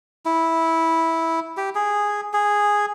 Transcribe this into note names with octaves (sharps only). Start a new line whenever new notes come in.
E4
G4
G#4
G#4